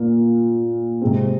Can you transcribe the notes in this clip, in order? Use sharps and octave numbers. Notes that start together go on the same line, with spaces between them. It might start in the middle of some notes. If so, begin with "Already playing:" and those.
Already playing: A#2 A#3
C3 G#3 C4